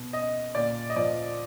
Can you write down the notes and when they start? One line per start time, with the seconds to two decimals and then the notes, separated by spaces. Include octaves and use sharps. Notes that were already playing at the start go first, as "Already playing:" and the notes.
Already playing: B2
0.13 D#5
0.55 A#2 D5
0.90 D#5
0.96 F3 D5